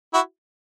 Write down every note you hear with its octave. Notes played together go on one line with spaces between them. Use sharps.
E4 F#4